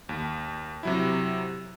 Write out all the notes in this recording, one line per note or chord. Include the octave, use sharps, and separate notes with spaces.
D#2
C3 F#3 E4